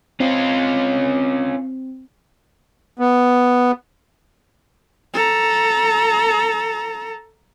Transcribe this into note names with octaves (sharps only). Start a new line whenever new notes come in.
C4 C#4 F4
B3
A4 A#5